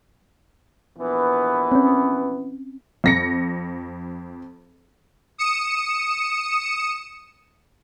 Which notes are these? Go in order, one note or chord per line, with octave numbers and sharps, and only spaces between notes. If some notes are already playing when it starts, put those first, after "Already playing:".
A#1 E3 B3
C4 C#4
F2 A#6 C#7
D#6 C#7 E7